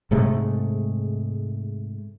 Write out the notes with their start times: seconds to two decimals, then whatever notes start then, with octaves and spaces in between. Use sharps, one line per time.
0.11 G#2 C3 G#3 A3